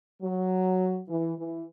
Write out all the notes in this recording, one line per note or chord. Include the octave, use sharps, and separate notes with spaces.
F#3
E3
E3